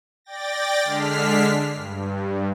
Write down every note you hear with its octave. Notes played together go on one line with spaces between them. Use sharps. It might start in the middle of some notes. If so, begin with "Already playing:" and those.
D5 G5 A6 A#6
D3 G#3 D4 F6 B6 C7
G2